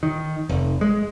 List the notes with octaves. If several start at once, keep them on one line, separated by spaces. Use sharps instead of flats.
D#3
F1
G#3